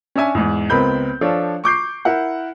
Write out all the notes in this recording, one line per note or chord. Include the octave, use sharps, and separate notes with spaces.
C#4 D4 E5 G#5
E2 G#2
C#2 B3 C4 A#4 B5 G6
F3 D4 F4 A4 C#5
C#6 D6 G6 C7
E4 A#4 F#5